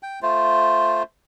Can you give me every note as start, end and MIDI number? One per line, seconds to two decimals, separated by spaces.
0.03 0.20 79
0.22 1.03 57
0.22 1.03 65
0.22 1.03 72